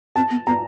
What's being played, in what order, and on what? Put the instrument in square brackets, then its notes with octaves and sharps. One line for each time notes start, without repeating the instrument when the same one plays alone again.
[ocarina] C4 [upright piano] A5
[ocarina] B3
[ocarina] B3 [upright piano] A#5